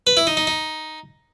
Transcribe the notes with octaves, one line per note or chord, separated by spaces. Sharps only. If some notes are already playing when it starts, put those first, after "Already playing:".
B4
E4
D#4
D#4
D#4